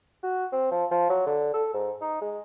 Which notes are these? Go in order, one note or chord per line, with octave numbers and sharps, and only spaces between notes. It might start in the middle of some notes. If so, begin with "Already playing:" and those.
F#4
C4
F3
F3
F#3
D3
A4
G#2
D#4
G#3